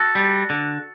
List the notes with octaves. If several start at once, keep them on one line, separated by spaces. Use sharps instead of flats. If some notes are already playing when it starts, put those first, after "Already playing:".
Already playing: F#4 A4
G3
D3